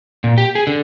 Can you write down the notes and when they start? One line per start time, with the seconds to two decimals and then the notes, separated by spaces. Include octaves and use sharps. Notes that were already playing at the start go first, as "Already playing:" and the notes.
0.24 A#2
0.38 G4
0.55 G#4
0.67 D3